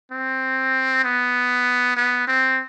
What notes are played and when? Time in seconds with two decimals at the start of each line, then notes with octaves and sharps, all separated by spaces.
0.12 C4
1.04 B3
1.97 B3
2.27 C4